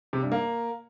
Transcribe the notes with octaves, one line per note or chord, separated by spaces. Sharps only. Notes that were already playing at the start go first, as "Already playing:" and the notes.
C3
G2
A#3